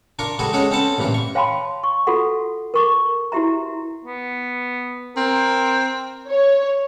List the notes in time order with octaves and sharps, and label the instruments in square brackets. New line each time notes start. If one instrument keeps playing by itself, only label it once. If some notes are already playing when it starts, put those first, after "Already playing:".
[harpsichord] D4 F4 A#4 C#6
G3 F#4 G#4 A4 B4
G#3 C#4 F#4 G#4 A4 C#5
C4 C#4 A4 B4 F#5 A5
A1 G2 A#2 E3 F4
C#6
[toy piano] C#5 F5 G5 A5 B5 C6
C#6
F4 F#4 A4 F#5
A#4 C#6 D6
E4 F#4 G4 E5 A#5
[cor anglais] B3
[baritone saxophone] C4 [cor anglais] A#4
[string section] C#5